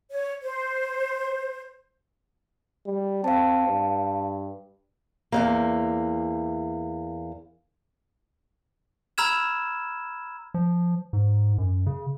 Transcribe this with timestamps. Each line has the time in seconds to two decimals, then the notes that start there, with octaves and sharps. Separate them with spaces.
0.11 C#5
0.42 C5
2.86 G3
3.24 C4 F5 A5
3.67 G2
5.32 E2 G2 A#3
9.18 A#5 B5 E6 F6 G#6 E7
10.54 F3
11.13 G#2
11.58 F#2
11.86 C#3